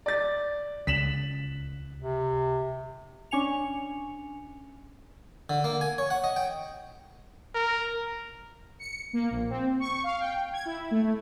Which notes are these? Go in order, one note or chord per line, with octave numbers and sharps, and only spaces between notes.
D5 A6
C#2 B6 E7 F#7
C3
C#4 D4 G#5 C#7 F7
D3
A#3
G#5
C#5
F#5
D#5
G5
A#4
C#7
A#3
A#1
C4
C#6
F5
G5
G#6
E4
A3